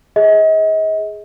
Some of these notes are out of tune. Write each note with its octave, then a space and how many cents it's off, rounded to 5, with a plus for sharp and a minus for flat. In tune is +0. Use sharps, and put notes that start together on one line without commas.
G#4 +0 D#5 +40